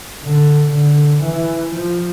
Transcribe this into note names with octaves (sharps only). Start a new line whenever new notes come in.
D3
D3
E3
F3